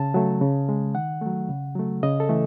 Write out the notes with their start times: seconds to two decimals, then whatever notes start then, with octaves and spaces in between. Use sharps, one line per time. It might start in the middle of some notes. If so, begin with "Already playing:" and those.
Already playing: C#3 A5
0.14 F#3 A3
0.41 C#3
0.69 G#3
0.95 D#3 F#5
1.21 F#3 A3
1.49 C#3
1.75 F#3 A3
2.03 C#3 D#5
2.20 A4
2.29 E3 A3